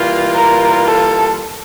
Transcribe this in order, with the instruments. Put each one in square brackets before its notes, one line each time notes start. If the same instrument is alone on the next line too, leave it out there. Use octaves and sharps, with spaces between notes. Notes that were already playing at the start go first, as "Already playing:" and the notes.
Already playing: [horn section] E3 G3 A#3 F4
[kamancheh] A#4
A4